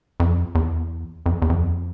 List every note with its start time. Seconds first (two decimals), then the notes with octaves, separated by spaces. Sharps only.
0.20 F2
0.55 E2
1.26 F2
1.42 E2
1.50 F2